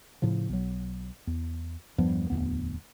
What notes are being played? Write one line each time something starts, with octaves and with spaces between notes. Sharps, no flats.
A2 C#3 F3
B1 F#3
E2
E2 G2 F3 B3
D1 G#1 E2 B3